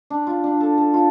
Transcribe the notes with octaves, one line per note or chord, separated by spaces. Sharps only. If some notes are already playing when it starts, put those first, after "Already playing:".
D4
F4
D4
A4
A4
F4